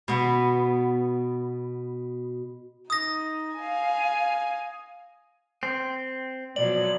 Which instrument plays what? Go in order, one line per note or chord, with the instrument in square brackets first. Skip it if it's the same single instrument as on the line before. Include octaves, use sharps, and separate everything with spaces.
[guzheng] B2 B3
[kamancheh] D#4 [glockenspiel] D#6 A#6
[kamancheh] F5 G#5
[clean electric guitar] C4
[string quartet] B2 F3 F#3 [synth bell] D5 [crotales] F#7